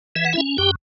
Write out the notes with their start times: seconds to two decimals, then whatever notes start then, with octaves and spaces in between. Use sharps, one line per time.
0.16 E3 E5
0.24 F#5
0.33 E4 E5
0.37 C#4
0.58 F#2 G4 G5